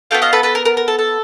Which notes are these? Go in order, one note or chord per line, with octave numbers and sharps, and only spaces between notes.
B3 D#4 F#4 A4 F5 G5
D#5 F5
A4 B4
A4 B4
A#4
A#4
A#4
A4
A4